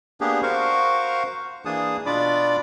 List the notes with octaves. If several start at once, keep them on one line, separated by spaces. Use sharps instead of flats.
A#3 B3 D4 G4 G#4
F#4 A#4 C5 F5 C#6
E3 A#3 D4 G#4 A5 D#6
B2 D4 F4 D5 B5 D6